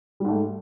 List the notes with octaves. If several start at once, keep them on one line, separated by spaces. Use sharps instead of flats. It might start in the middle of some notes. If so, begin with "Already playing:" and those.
G#2 G3 A3